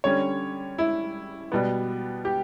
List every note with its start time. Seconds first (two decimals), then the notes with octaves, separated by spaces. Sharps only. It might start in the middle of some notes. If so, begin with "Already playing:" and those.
0.04 D3 G3 C#4 C#5
0.78 E4
1.52 B2 G3 B3
2.25 G4